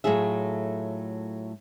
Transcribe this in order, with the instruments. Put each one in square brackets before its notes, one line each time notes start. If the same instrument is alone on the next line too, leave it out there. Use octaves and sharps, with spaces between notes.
[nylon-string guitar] A2 F#3 A3 F4 G#4 E5